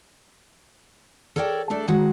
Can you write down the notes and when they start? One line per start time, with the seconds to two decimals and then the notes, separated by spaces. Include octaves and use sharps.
1.36 A4 A#4 C#5 D5 F#5 G5
1.70 A3 D4 A4 D5
1.88 D#3 G#3 F#4